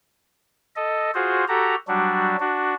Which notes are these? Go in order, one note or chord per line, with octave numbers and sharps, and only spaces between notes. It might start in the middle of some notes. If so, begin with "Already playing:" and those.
A4 D#5
F4 F#4 G#4 C5
F#4 G4 A4 A#5
F#3 G3 D4 F#4
D4 F#4